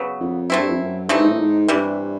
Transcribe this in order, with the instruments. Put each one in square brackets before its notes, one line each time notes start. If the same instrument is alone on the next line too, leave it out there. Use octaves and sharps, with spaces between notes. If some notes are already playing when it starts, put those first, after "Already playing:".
Already playing: [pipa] C#3 F#3 B3
[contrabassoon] F2
[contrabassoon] F#2 [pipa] A3 C4 E4
[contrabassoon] G2
F2
F#2
[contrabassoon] G2 [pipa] E3 A3 C4 D#4
[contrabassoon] G#2
A2
G#2
[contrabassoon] G2 [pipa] C3 E3 G3